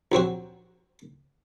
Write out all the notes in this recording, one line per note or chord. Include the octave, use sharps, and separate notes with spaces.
A#1 F#3 C4 F#4